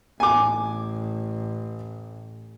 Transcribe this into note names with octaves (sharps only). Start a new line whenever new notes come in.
A1 G#5 D6